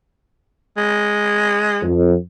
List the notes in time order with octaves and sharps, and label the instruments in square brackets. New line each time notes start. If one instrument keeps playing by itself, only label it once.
[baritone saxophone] G#3
[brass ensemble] F2